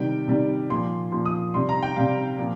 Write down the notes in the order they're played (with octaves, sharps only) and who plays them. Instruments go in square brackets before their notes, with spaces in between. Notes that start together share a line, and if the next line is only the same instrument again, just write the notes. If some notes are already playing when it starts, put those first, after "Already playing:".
Already playing: [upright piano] C3 D#3 G3 G5
C3 D#3 G3
A#2 F3 C6
A#2 F3 C6
D#6
C3 G3 C6
A#5
G5
C3 G3 F5
A#2 F3